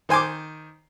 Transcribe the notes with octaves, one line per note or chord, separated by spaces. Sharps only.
D#3 C5 G#5 C6 D6